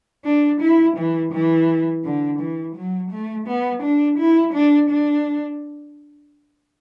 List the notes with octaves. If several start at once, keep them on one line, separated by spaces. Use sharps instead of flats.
D4
E4
E3
E3
D3
E3
F#3
A3
B3
D4
E4
D4
D4